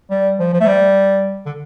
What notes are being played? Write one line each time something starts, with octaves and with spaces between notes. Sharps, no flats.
G3
F3
F3
A3
G3
D3